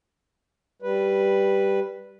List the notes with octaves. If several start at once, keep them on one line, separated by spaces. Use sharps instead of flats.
G3 B4